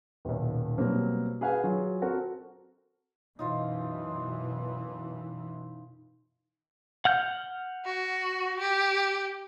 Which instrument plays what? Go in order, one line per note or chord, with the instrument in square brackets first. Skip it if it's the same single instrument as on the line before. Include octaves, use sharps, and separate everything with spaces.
[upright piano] D#1 B1
B2 F#3 G3 A#3 C4
G#4 B4 F5 F#5 G#5
F#3 F4 G#4
C4 F#4 A4 A#4
[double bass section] F#2 B2 E3 [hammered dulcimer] D#4 F4 C5
[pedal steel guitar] F#5 F6 G6
[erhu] F#4
G4